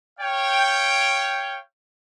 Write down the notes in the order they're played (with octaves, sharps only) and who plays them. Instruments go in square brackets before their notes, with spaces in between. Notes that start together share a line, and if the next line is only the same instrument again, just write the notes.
[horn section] C#5 F5 G5